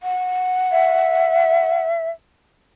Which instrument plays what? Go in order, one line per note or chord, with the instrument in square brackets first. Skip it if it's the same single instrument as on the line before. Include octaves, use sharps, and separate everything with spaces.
[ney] F#5
[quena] E5